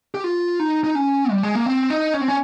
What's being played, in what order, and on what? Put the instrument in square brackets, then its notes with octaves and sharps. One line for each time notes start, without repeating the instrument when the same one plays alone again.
[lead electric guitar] G4
F4
D#4
D#4
C#4
G3
G#3
A#3
C4
D#4
C#4
C4
C#4